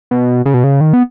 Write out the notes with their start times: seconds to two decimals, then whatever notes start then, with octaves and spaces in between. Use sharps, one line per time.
0.11 B2
0.46 C#3
0.54 B2
0.64 C#3
0.81 D#3
0.93 B3